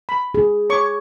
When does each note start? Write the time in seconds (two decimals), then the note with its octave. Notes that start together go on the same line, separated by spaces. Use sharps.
0.09 B5
0.34 G#4
0.70 C#5 C#6 D6